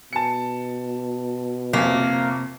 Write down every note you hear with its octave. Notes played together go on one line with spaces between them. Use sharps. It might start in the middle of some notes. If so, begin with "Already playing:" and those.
B2 A5 C#7
G1 F2 C3 A#3